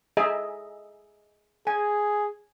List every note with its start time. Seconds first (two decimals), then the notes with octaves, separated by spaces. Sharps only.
0.17 G#4 D#5 E5
1.67 G#4 G#5